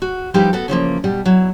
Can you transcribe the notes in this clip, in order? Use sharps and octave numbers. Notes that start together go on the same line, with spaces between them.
F#4
F3 G3 D#4 E4 G4 B4
B3 F#4 A4
C#3 E3 F3 A#3
B2 G3
F#3 E4